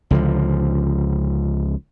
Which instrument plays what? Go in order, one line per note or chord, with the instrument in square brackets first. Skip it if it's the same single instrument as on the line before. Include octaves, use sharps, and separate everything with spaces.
[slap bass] C#2 D3 F3